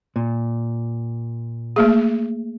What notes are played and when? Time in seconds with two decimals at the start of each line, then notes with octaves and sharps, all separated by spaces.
0.16 A#2
1.76 A3 A#3 G#4